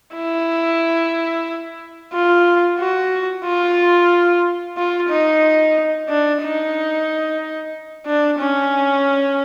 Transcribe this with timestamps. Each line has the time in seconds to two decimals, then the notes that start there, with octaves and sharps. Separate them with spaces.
0.15 E4
2.13 F4
2.79 F#4
3.45 F4
4.77 F4
5.09 D#4
6.09 D4
6.41 D#4
8.07 D4
8.39 C#4